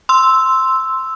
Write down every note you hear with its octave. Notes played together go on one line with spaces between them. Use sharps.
C6 E6